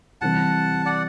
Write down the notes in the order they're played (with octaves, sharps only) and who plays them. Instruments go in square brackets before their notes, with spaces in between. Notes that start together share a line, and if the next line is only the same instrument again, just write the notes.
[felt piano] C3 E3 G3 C4 [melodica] F#5 A5
[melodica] D5 F#5